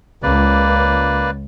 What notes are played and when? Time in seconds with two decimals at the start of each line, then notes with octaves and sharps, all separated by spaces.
0.23 C#2 A#3 B4 D5